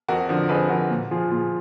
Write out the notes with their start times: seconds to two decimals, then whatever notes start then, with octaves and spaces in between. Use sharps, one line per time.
0.09 F2 F#4 A#4
0.29 D3 F3
0.49 F2 G#4 B4
0.69 D3 F3 F#4 A#4
0.90 A#2
1.11 F3 F4 G#4
1.31 A#2 F4 G#4